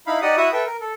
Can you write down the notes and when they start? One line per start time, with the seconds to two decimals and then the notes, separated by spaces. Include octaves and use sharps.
0.07 D#4 E4 F5 B5
0.22 D#4 G4 D5 D#5 F#5 D#6
0.37 E4 F#4 E5 F#5 D#6
0.52 A4 B4 E5 G5
0.66 A#4
0.81 A4